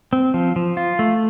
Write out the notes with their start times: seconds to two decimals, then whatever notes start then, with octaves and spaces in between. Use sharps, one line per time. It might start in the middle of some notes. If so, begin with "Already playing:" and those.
0.13 C4
0.34 F3
0.56 F3
0.77 F4
0.99 A3